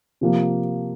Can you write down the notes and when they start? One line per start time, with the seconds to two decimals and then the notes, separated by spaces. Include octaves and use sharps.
0.21 C3 F3 A#3